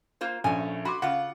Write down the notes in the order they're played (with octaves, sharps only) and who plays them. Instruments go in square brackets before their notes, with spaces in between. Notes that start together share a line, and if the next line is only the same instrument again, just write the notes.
[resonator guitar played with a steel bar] A#3 F4 C5
[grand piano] A#1 C#4 [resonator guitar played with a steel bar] A3 G#5
[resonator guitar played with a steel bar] F#4 [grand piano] B5 C6 D6
[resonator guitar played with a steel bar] C#3 F4 [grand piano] F#5